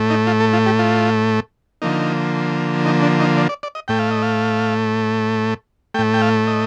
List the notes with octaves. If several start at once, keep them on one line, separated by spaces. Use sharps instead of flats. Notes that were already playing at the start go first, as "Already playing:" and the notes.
Already playing: A2 A3
D#4
F4
A4
F4
G4
F4
D3 F3 A#3 D#4
D#4
D4
D#4
D5
D5
D5
D#5
A2 A3 G5
F5
D#5
F5
A2 A3 G5
G5
F5
D#5